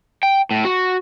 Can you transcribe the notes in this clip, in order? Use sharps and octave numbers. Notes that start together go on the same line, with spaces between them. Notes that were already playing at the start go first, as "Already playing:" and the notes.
G5
A2
F#4